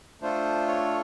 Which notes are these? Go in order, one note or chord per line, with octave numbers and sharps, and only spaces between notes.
A3 D4 F4 A4 C5
C#5